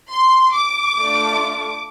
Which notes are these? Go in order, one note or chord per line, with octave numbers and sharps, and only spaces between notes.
C6
D6
A3 D4 F4